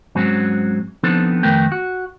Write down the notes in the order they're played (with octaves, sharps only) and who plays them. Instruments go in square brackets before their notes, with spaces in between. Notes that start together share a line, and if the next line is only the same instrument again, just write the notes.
[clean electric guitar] G#2 F#3 C4 C#4
F3 B3 C4 D4 D#4 A4
F2 D#3 A3 A#4 B4 G5
F#4